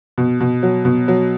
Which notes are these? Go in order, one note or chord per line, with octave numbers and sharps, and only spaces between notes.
B2
B2
F#3
B2
F#3